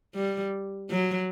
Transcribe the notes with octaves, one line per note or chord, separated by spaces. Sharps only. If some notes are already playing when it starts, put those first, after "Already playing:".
G3
F#3